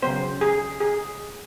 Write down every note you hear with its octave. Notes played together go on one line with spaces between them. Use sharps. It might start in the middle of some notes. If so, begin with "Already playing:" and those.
C#3 F#3 B3 C5
G#4
G#4